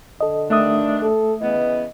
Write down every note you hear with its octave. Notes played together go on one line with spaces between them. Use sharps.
D3 A4 D#5
G2 D#3 A3 D4 E5 D#6
A4
C#3 E3 B3 D#5